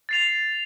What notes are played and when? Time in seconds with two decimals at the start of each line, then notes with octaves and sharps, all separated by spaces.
0.09 A6 C7 F7